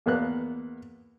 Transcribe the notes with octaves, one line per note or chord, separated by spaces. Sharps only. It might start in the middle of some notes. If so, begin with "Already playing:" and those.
E2 A#3 B3 F#6